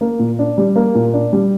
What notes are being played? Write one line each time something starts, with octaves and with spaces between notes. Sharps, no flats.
A#3
A#2
D4
G3
A#3
A#2
D4
G3